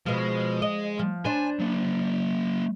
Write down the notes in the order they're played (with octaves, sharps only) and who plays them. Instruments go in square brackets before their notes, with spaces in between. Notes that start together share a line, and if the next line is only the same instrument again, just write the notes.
[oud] B2 F3 [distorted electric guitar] G#3
[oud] D#5
F3
[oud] D4 C5 [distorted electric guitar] G#5
[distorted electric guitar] F#3 A#3